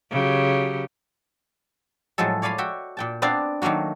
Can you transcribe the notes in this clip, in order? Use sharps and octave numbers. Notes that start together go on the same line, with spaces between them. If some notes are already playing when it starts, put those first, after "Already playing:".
C#3 F#3 G4
A2 F3 F#3 G#3 A4
C#5 D5 F5 G#5 B5
F#4 E5 G5
A#2 G5 A5
B3 C4 D4 D5 F5 A#5
D#3 F#3 A3 A#3 F#4